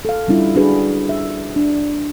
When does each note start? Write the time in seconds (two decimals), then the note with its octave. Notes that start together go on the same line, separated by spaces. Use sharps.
0.05 A4 F5
0.28 G3 C#4 D4 E4 F4
0.55 D4 E4 F#4 G#4 B4
1.09 E5
1.56 D4